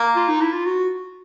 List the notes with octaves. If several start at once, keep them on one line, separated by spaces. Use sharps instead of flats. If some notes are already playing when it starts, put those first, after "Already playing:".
Already playing: A#3
F4
D#4
E4
F4
F#4